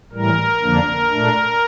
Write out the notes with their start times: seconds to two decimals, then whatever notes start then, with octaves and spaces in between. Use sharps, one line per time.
0.12 A2 E3 G3 A#4
0.62 F2 D3 F3 A#3 D4
1.11 A#2 A3 D4